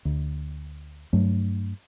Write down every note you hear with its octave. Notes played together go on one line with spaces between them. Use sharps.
D2
G2 F#3 A3